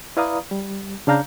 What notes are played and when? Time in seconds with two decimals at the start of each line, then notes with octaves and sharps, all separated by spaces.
0.17 E4 B4 D5 F5 A#5 D#6
0.51 G3
1.07 C#3 D4 F5 A#5 G6